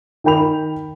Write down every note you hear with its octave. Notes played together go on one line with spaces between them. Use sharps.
D#3 A#4 G5 B5 F7